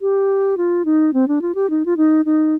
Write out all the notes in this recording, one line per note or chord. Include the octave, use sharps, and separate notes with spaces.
G4
F4
D#4
C4
D4
F4
G4
D#4
F4
D#4
D#4